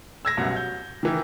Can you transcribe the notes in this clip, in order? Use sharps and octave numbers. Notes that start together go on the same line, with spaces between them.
E6 G#6 A#6
C2 F#2 B2
G6
D#3 E3